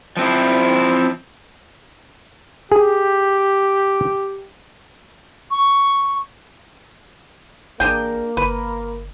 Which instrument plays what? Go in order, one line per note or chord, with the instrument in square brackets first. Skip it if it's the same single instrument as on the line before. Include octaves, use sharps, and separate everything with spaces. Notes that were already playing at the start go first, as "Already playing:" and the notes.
[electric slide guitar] F3 C4 E4
[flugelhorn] G4 [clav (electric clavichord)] G#4
[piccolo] C#6
[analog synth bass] A1 [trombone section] A#3 [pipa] D4 G#4 G5
[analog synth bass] G1 [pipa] B4